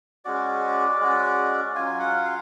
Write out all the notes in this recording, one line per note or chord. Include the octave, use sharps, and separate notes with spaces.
G#3 C#4 F#4 D5
G#3 C#4 F#4
F#3 C#4 F4 G#5
F#5
F5